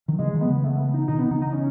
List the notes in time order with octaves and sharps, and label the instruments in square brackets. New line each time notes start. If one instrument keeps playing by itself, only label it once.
[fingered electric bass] D#3 F#3
[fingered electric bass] C#3 E3 [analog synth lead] G#3
[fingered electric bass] D#3 F#3
[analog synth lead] B3
[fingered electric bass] C#3 E3
[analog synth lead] A3
B3
D#4
[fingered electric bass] B2 D#3 [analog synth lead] D#4
[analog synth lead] B3
[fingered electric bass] C#3 E3 [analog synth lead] D#4
[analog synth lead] D#4
C#4